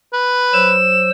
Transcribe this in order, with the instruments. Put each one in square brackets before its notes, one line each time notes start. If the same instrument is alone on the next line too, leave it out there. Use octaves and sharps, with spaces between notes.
[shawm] B4
[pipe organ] F#3 C5 E6 [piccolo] E7